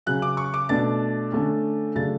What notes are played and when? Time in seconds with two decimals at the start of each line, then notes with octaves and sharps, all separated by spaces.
0.06 C#3 F#3 C#4 F#6
0.22 D6
0.37 C#6
0.54 D6
0.69 B2 A3 D4 A6
1.32 D3 A3 C#4
1.96 C#3 F#3 A3 D4 A6